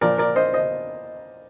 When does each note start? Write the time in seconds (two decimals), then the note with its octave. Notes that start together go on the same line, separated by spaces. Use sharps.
0.01 A#2 F3 A#4 D5
0.18 A#4 D5
0.36 C5 D#5
0.53 C5 D#5